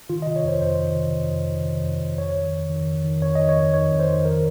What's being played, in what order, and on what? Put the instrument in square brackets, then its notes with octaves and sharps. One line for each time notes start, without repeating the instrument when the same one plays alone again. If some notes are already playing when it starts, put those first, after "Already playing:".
[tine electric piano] D#3 F4
D#5
C3
C#5
F2 C5
F2 C5
D#3
C3
F2
F2
D#3
C3
F2
F2
F2 C#5
D#3
F2
D#3
F2
D#3
F2 C#5
D#3 D#5
C#5
F2
D#3 C#5
F2
C5
D#3
D#3 A#4